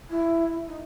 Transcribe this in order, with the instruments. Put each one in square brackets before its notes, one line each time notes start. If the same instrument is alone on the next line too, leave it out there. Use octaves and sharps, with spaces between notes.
[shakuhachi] E4
D#4